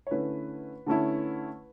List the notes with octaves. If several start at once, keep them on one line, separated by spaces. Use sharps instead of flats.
C#5
D3 A3 C#4 E4 B4
D3 A3 C#4 E4